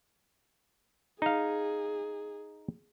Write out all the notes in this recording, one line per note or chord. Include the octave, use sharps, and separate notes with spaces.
D#4 G#4 F5